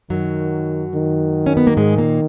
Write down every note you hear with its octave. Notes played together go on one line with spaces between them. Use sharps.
F#2 D#3 F#3
D#3
C#4
B3
A#3
G#2 G#3
A#2 A#3